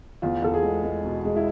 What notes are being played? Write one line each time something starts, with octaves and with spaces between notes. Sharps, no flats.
E2 F4
E2 A4
G#4
G#3
G#3
B2
G#3
E4